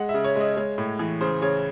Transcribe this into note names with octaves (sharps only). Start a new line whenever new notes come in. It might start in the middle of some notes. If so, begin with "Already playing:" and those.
Already playing: G#3 F#5
E5
C#3
C#5
G#3 D#5
G#3 C#5
A2
E3
C#3 C5
C#3 C#5